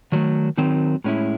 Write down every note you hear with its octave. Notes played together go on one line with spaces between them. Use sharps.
D#3 F#3 A3
D#3 F#3 C4 D#4
A2 G#3 C#4 E4